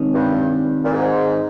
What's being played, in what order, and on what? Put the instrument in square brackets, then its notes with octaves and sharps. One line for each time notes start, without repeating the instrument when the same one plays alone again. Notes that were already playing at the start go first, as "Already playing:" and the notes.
Already playing: [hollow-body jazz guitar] C3 D#3 G#3 C#4
[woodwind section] G2
A#2
G#2